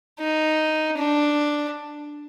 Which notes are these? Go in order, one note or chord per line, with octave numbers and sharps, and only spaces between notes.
D#4
D4